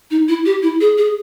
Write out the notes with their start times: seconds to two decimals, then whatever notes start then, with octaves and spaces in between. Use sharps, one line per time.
0.11 D#4
0.28 E4
0.46 G4
0.63 E4
0.81 G#4
0.98 G#4